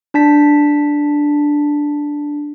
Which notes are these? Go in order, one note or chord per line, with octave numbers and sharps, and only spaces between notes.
D4 A5 B6